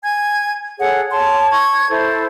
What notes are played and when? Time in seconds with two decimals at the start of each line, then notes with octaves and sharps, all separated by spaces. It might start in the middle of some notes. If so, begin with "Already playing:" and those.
0.03 G#5 G#6
0.79 G#4 A4 C#5 F#5
1.11 C#5 A5 C6
1.51 C#6 G#6
1.89 E4 A4 C5